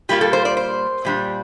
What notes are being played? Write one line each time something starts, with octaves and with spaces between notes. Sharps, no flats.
A#2 G3 A#3 F4 G4
A4
C5
D5
C5
A#2 G3 D4